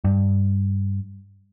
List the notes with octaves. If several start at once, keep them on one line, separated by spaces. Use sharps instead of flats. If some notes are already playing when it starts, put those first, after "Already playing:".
G2